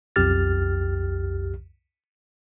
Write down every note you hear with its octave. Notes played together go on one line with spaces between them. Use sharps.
B1 F2 G4 F6 A6